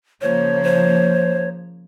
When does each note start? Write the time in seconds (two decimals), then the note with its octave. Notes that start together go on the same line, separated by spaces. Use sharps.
0.22 C#3 F3 A#3 C5 C#5
0.64 C5